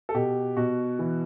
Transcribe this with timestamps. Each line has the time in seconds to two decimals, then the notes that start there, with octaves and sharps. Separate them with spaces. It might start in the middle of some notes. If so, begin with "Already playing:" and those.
0.09 A4
0.14 B2 G4
0.57 B2 F#4
0.99 E3